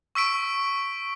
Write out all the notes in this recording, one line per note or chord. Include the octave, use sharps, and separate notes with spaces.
C#6 E6 B6 D7